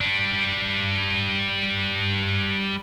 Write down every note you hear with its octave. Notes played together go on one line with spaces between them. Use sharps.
G3 D4